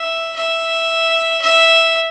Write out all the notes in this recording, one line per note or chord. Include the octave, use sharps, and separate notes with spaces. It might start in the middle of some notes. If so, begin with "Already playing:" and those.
Already playing: E5
E5
E5